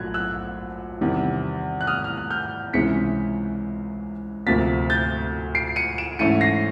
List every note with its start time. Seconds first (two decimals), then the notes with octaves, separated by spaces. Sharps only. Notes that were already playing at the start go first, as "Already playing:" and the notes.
Already playing: A#1 A#2 F#3 A3 F#6 G#6
0.14 E6 F#6
1.01 E2 C3 D#3 G3
1.81 F#6
1.87 D#6 F6
2.04 F6
2.17 F#6
2.30 F6 G6
2.73 C#2 C3 E3 G#3 C#4 B6 C#7
4.46 D2 C3 F3 A#3 A6 B6
4.90 G6 A6
5.55 C7 D7
5.76 C#7 D#7
5.98 D7 E7
6.19 G#2 E3 A3 C#4 C#7 D#7
6.41 A#6 C7